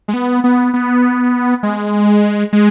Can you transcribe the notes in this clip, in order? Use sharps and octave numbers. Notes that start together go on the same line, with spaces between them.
G#3
B3
B3
B3
G#3
G#3